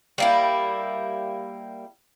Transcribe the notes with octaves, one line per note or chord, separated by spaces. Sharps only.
G3 A#3 E4